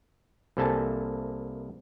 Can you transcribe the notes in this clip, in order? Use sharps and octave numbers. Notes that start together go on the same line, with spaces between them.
C2 C3 A#3 A4 G#5 A5